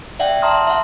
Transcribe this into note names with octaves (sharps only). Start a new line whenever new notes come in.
D5 E5 F#5 G5
E5 A5 A#5 C6 D#6 F6
E5 F#5